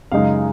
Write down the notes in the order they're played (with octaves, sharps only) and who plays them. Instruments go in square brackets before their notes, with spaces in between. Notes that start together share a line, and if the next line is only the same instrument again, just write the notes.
[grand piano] F#2 C#3 G#3 D#4 F5